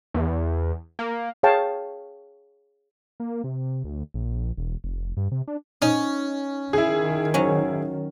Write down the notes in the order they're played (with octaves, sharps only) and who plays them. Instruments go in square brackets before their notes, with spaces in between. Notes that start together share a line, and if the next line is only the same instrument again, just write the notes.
[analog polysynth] E2
A#3
[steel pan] G#4 C#5 F5 G5 A5
[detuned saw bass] A#3
C3
D2
A#1
E1
F1
G2
C3
D4
[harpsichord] C#4 [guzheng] D#4
[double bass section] D#3 [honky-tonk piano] E4 G#4
[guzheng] F#3 C#4